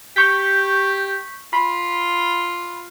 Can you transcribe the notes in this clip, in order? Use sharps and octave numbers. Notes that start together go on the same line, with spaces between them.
G4 C#6 G6 B6
F4 B5